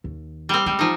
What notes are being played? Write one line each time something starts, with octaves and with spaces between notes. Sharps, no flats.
D#2
G3 C4
G3 G#3
F3 D#4